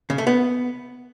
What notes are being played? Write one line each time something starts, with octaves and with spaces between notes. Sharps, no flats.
C#3
A3
B3